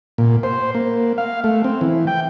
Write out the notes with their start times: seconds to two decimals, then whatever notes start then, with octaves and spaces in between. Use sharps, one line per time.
0.18 A#2
0.43 C5
0.75 A#3
1.18 F5
1.44 A3
1.64 C4
1.81 E3
2.07 G5